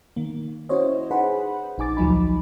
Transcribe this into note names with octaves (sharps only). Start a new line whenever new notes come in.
D#3 A#3
C#4 E4 F#4 C5 C#5 D#5
D#4 G#4 B4 C5 F#5 B5
A#1 D#4 G#5 D6 A6
D2 F3 F#3 D#4 B5